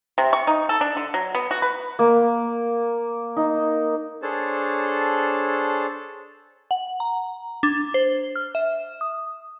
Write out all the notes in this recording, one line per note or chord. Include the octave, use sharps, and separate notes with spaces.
C3
C#6
D#4
A4
D4
D3
F#3
B3
F#4
B4
A#3
D#4
D4 G#4 A4 C5 C#5 A5
F#5
A#5
D4
C5
F6
E5
D#6